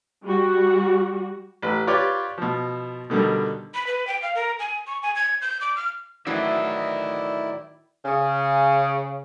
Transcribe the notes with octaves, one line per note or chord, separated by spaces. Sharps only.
G3 F#4
A1 B4
F4 G4 B4 C#5 D5 D6
B2 F3
B2 D3 D#3 G3
B5
B4
G5
F5
A#4
G#5
C#6
G#5
G#6
G6
D6
F6
A2 D#3 E3 F#3 E4 D5 E5
C#3